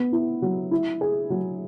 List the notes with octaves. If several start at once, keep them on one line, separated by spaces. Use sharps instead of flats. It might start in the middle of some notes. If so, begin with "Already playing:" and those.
Already playing: B3
E4
F#3
E4
G#4
F#3